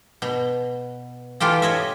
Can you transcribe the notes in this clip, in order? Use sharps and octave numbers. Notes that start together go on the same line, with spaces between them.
B2
E3 F4 G4 A4
C#5 D#5 E5